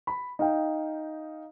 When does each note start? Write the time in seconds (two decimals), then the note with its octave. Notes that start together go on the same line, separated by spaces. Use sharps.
0.07 B5
0.39 D#4 F5 G5